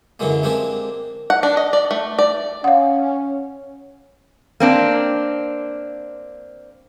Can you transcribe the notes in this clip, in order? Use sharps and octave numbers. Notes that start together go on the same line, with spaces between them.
F#2 D3 E3 F#3 G#3 A#3
G#3 A#3 C4 D4 G4 G#4
F#5
D4
D#5
D5
A3
D5
C#4 F5 F#5
A#3 C4 D4